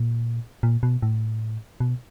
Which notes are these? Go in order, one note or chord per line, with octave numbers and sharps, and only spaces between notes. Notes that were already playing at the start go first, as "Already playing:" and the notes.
Already playing: A#2
A#2
B2
A2
B2